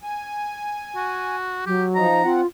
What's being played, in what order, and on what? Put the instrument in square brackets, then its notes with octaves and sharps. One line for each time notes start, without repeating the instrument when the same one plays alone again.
[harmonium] G#5
[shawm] F#4
[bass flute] F#3 [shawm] G4
[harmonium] F3 D#4 [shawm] A#5
[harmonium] C4 F#5 [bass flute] F4